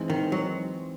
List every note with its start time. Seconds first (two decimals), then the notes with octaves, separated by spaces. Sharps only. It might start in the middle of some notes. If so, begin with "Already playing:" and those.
Already playing: E3 G#3 C4 D#4
0.10 D#3
0.32 F#3